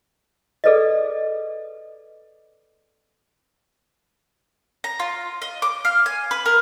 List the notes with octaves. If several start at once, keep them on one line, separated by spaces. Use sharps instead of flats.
G#4 A4 B4 D5 D#5
A#5
F4
D#5
D6
F5
G#5
B4
A#4